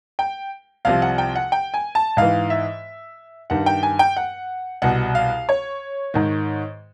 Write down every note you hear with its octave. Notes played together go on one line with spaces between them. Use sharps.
G5
C2 C3 F3 F5
F#5
G5
F#5
G5
G#5
A5
G#2 E3 F5
E5
G2 D#3 F#5
G5
G#5
G5
F#5
C2 B2 F#5
F5
C#5
G#2 D#3